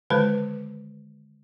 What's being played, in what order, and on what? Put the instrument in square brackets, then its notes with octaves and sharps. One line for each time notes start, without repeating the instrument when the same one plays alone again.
[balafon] D3 D#3 G#3 B4 C5